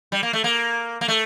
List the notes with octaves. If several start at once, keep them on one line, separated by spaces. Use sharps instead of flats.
G3
A#3
A3
A#3
A#3
A3